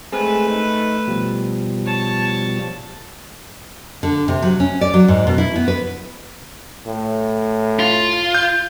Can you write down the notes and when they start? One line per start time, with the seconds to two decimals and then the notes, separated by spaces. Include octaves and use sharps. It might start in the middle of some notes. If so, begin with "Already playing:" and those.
0.12 G#3 A3 C4 G#4 B4
0.51 D#4
1.08 B2 F3 G3
1.86 C#5 A5
4.03 D3
4.28 C3
4.42 F#3
4.60 C#4
4.81 D5
4.94 F#3
5.08 G#2
5.27 B2
5.38 E4
5.56 B3
5.68 B4
6.86 A2
7.79 F4
8.35 G6